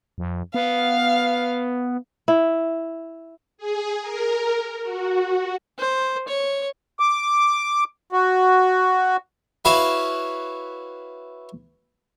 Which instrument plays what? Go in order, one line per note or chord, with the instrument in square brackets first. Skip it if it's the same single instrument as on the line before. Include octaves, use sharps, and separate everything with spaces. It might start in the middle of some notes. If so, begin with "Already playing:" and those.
[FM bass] F2
[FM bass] B3 [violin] F5
[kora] E4
[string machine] G#4
A#4
F#4
[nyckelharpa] C5
C#5
[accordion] D6
F#4
[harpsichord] E4 F#4 B4 C#5 E5 F5